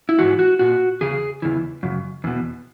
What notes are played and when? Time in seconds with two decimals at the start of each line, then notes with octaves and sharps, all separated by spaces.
0.09 E4
0.19 G#2 E3 F#4
0.39 F#4
0.59 A#2 F#4
1.01 E2 C#3 G#4
1.42 E2 C#3 E3
1.83 F#2 C#3
2.24 E2 B2